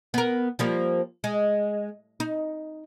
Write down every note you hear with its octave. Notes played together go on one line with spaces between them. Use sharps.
B3 A#4
F3 G3 A#3
G#3
D#4